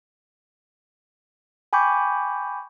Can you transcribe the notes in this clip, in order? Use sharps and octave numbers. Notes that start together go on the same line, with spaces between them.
G5 G#5 B5 C#6 D6 G6